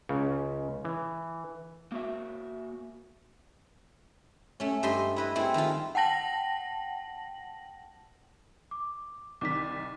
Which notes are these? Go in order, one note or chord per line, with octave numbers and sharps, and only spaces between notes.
C#2 C#3
E3
A#3 F#4 E5
A3 C#4
G2 C5 D#5 E5 C6
E4 B4 D#5
A3 C4 E4 G#4
D#3 F3 G#3 F4
F#5 G5 A5 A#6 F#7
D6
C2 D#3 D6 B6